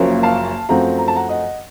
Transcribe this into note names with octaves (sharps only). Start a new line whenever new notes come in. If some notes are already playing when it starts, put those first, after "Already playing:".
Already playing: F#1 F#2 F3 A#3 C#4
F5 A5
F#2 F3 A3 C4 F#5 A#5
A#5
A5
F#5 A#5
D#5 F#5